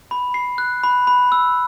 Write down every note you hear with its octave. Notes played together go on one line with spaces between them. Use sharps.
B5
C7
F#6
B5
B5
E6